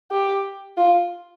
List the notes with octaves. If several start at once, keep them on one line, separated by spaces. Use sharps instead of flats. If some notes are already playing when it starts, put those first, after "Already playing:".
G4
F4